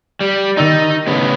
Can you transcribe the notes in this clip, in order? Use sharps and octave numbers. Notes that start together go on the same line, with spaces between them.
G3
D#3 D#4 E6 A6
A2 C#3 B3